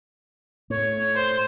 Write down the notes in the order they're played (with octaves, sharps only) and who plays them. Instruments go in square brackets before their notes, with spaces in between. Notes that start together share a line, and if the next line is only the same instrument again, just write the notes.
[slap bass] A2 [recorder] C#5
[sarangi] C5 [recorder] C6